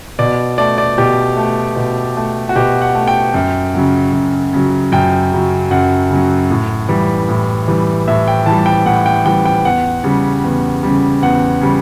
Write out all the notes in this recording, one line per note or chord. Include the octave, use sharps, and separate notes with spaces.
B2 D5
A3 D5
D5
B2 G4
A3
B2
A3
F#4
B2 G4
F#5
A3
G5
F#2
C#3 F#3
F#2
C#3 F#3
F#2 G5
C#3 F#3
F#2 F#5
C#3 F#3
A2
E3 G3
A2
E3 G3
A2 E5
G5
E3 G3 A5
G5
A2 F#5
G5
E3 G3 G5
G5
E2 F#5
C#3 G3
E2
C#3 G3
E2 F#5
C#3 G3